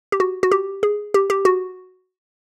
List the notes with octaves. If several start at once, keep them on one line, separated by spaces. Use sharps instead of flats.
G4
F#4
F#4
G4
G#4
G4
G4
F#4